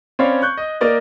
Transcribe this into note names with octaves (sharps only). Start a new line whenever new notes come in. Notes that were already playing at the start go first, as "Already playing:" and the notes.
C4 C#4 C#5 D5 F5 B5
C#6 F#6 G6
D#5
A#3 A#4 D5 D#5